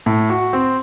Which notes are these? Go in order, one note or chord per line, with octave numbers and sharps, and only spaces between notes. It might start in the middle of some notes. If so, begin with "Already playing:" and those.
A2
F#4
C4